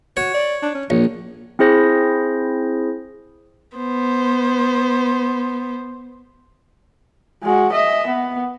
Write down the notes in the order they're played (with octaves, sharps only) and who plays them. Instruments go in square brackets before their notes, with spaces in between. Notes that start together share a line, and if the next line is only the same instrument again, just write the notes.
[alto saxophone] F#4 [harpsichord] C#5
[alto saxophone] D5
D4
C#4
[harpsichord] A#1 [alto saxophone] C#5
[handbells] C4 E4 G#4 C5 A#6
[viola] B3 C5
[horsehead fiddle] G#3 F#4
D#5 E5
B3